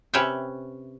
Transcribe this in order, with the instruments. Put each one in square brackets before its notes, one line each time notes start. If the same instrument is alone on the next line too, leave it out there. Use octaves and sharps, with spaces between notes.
[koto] C3 C#4 B4 C#5 E5 G5